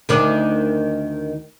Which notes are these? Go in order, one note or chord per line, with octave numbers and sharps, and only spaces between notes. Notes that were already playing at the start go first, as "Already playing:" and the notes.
D2 D#3 D4